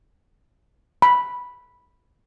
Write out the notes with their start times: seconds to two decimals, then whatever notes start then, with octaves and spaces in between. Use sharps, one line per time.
1.02 B5